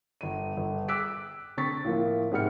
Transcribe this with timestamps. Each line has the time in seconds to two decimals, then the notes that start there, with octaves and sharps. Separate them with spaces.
0.21 G1 D#7
0.57 G1
0.88 D6 E6 F#6 B6 D7
1.57 D3 C4 C#6 A6 B6
1.85 A2 F3 A#3
2.31 G#2 C3 G3 F#5 F6 C#7